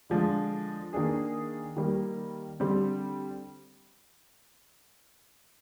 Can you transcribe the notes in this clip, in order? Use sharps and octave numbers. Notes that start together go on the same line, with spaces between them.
D3 F3 G#3 D4
D#3 A#3 D4 G#4
D#3 G3 A#3
D3 G3 C4